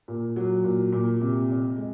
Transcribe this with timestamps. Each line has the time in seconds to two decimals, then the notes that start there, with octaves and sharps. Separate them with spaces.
0.08 A#2
0.36 F#3
0.64 A#2
0.92 A#2
1.21 C3
1.49 F2
1.77 G#3